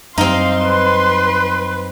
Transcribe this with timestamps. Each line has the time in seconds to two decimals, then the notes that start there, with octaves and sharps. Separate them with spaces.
0.18 F#2 G3 C4 D#4 F5 C6
0.64 B4